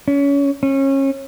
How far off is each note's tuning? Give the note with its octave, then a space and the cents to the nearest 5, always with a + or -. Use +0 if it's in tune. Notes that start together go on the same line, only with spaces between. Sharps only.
C#4 +25
C#4 -30